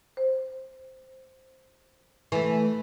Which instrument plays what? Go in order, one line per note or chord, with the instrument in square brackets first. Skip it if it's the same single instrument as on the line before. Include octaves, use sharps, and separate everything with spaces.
[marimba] C5
[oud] E3 A3 [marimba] G#5